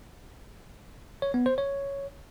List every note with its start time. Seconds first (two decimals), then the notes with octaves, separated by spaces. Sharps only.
1.22 C#5
1.34 B3
1.46 C5
1.58 C#5